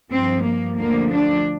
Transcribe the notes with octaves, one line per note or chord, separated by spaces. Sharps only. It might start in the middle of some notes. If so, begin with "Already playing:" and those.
G2 F3 C4
A#3
D2 D3 F3 A#3
D4